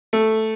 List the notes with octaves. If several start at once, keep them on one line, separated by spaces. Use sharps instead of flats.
A3